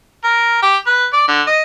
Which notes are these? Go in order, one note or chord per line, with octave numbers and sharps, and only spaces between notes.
A#4
G4
B4
D5
D3
D#5